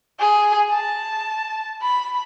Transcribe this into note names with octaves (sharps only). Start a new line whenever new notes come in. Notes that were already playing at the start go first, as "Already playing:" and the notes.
G#4
A5
B5